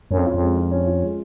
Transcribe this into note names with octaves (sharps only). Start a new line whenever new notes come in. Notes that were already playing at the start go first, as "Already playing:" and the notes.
F#2 C#4
F2
F4
F2
G#3
F4
C#4
F4
G#3